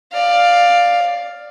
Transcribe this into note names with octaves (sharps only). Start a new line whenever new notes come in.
D5 F5